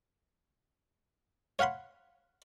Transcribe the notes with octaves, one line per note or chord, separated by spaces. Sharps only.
C#5 F5 F#5 B5 C6